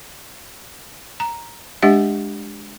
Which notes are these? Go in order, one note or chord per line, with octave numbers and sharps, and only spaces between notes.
A#5
G#3 D4 G4 E5 F#5